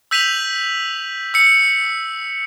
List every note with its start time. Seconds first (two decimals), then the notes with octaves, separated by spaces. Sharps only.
0.11 E6 G6 B6 D#7 F7 F#7
1.34 E6 C#7